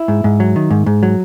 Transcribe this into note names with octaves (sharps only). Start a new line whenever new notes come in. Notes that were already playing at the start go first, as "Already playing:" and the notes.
Already playing: E4
G#2
G#2
F#3
D#3
G#2
G#2
F#3